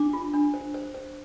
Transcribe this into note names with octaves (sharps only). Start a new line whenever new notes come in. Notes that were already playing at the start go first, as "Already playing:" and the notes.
Already playing: D4 D6
F4
D4
C5
C5
C5